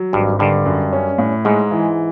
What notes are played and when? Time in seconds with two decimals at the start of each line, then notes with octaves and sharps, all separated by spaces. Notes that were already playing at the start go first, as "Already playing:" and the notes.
Already playing: F#3
0.13 G#1 G2
0.39 G2 D3
0.65 F#2
0.93 C#4
1.18 A2
1.45 G#2 G#3
1.71 E3